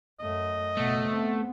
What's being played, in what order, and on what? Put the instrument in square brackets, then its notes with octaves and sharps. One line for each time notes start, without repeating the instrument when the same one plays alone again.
[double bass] F#2 A3 [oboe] D#5
[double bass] F#1 B2 [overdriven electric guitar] A3
[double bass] B3 C4